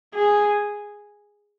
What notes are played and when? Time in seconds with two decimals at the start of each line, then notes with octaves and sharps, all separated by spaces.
0.14 G#4